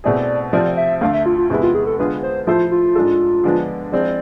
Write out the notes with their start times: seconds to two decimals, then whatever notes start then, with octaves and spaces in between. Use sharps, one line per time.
0.04 B2 A3 C4 E4 G#4 D5
0.53 C3 F3 A3 C4 F4 D5
0.77 E5
1.01 D2 D3 A3 F5
1.13 E5
1.26 F4
1.38 F4
1.50 E2 C3 G#3 B3 E4
1.62 F4
1.75 G#4
1.87 A4
1.99 D3 G#3 B3 F4 G#4 B4
2.23 C5
2.47 F3 A3 E4 F4 A4 C5
2.71 F4
2.95 G#2 G#3 D4 A4
3.44 D3 F3 G#3 B3 D4
3.92 F3 G#3 C4 E4 D5